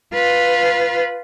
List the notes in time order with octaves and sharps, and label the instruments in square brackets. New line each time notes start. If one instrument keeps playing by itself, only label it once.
[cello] F4 B4